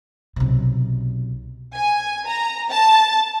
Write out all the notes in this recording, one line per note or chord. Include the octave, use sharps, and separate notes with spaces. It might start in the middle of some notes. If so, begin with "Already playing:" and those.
B1 C3
G#5
A#5
A5